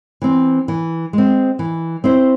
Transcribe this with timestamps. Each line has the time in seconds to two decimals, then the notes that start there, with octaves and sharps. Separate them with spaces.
0.22 E3 C4
0.68 E3
1.13 G#3 C4
1.59 E3
2.04 C4 E4 C5